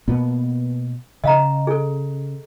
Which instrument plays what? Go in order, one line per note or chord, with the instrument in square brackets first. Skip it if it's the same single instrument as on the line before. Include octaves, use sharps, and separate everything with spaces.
[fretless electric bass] B2 A#3 B3
[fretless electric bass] C#3 [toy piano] D#5 F5 A#5
[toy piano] G#4 A4